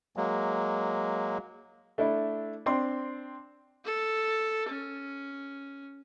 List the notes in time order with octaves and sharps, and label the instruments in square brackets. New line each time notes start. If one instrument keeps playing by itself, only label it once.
[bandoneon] F#3 G#3 A#3
[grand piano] A3 D4 E4
C4 D4 C6
[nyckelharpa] A4
C#4